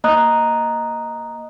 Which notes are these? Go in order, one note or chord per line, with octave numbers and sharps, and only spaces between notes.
A#3 D#5 A#5 D#6 F#6